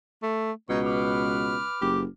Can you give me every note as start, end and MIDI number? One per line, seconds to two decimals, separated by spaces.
0.23 0.52 57
0.70 1.65 37
0.70 1.56 47
0.70 0.79 63
0.70 0.79 73
0.85 2.03 71
0.85 2.03 86
0.85 2.03 89
1.81 2.06 30
1.81 2.01 67